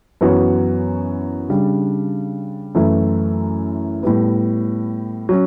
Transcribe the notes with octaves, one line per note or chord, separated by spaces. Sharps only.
F#2 E3 B3 F#4 C#5
C#3 G3 D4
F#2 E3 A3 E4
A2 G3 B3
F#3 C#4